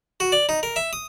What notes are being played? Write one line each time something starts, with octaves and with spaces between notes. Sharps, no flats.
F#4
D5
D#4
A#4
E5
D#6